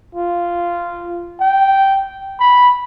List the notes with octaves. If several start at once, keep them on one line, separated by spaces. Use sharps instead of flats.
F4
G5
B5